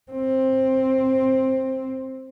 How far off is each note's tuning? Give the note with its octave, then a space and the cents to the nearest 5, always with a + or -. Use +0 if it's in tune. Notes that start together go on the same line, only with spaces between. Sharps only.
C4 +10